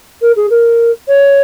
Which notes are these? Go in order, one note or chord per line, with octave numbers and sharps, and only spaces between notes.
A#4
G#4
A#4
C#5